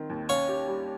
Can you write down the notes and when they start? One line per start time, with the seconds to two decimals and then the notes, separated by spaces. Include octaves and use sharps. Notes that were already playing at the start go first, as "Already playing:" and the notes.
Already playing: D#3 C4
0.10 D#2
0.29 C#4 C#5 F5
0.48 G4
0.68 G3